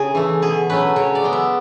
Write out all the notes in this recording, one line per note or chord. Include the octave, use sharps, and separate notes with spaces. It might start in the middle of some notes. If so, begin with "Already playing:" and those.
Already playing: C#3 G#4
E3 A3
B2 G#4
F#3 A3 C#4 B4
C#3 C#5
D5
G#3 B3
E5